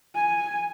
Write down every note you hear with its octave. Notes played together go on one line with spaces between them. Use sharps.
G#5